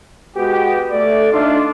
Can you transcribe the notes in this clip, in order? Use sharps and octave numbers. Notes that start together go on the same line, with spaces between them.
G#3 B3 F#4 G4
A3 D5
A3 D4 D#4 F4